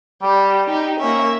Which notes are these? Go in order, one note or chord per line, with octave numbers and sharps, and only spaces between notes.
G3 G4
D#4 G4
A#3 C#4 E5